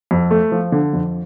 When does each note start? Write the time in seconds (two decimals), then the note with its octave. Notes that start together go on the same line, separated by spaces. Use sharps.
0.11 F2
0.31 A3
0.52 F3
0.72 D3
0.93 F2